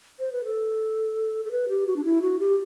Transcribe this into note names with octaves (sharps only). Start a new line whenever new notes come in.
C5
B4
A4
A4
B4
G4
F#4
D4
E4
F#4
G4